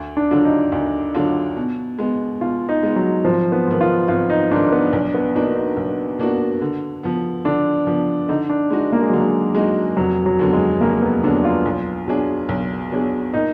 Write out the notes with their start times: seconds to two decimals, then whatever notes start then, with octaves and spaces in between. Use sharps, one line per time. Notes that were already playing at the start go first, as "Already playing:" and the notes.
Already playing: D2
0.17 D4
0.31 D3 F#3 D4 F4
0.45 D#4
0.72 D2
1.14 D3 F#3 D4 F4
1.57 B2
1.99 G#3 B3
2.41 B2 F4
2.69 D#4
2.83 G#3 B3
2.96 F#3
3.24 G#1 F3
3.52 B3
3.67 G#2 D#3
3.81 F4
4.08 G#1 F4
4.30 D#4
4.51 G#2 D#3 D4
4.72 B3
4.93 B1 D4
5.14 B3
5.34 B2 A#3 D4 D#4 F#4
5.55 D#4
5.77 B1
6.18 B2 A#3 D4 F#4
6.62 D3
7.03 F3 B3
7.45 D3 D4
7.87 F3 B3
8.28 D3 D#4
8.49 D4
8.70 G#3 D#4 F#4
8.92 A#3
9.02 G#3
9.10 D3 F#3
9.20 G#3
9.55 G#3 D#4 F#4
9.97 F1 F#3
10.26 F#3
10.39 D#2 D3 F#3 B3
10.53 G#3
10.81 F1 A#3
11.02 B3
11.23 D#2 D3 F#3 B3 D4
11.45 F4
11.65 B1
12.07 B2 F#3 D4 G#4
12.49 B1
12.92 B2 F#3 D4 G#4
13.34 A#2 D#4